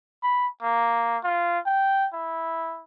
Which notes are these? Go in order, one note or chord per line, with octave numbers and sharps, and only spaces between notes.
B5
A#3
F4
G5
E4